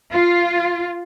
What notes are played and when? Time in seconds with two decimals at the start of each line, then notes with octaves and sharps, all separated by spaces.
0.12 F4